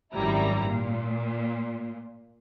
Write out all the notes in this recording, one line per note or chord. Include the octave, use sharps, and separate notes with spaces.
G#1 F#2 G3 E4 A#5
A#2